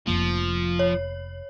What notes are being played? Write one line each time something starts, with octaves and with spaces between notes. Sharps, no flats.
F1 F2 F3 A#3
C#5